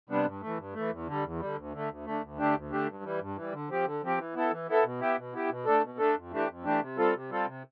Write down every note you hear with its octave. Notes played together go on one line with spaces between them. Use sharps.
C3 G3 B3 D4
G2
A3
E3
G2
E3 A3
E2
D3 G3
E2
D3 G3
D2
D3 A3
D2
D3 A3
D2
D3 A3 D4 G4
D2
D3 A3 D4 G4
G2
E3 G3
G2
E3 G3
D3
F3 C4 G4
D3
F3 C4 G4
E3
B3 E4 A4
E3
B3 E4 A4
B2
B3 E4 G4
B2
B3 E4 G4
B2
A3 D4 A4
B2
A3 D4 A4
F2
E3 A3 D4 G4
F2
E3 A3 D4 G4
C3
G3 C4 F4 A4
C3
G3 C4 F4 A4
C3